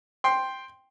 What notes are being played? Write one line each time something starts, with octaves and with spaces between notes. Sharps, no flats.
G5 C6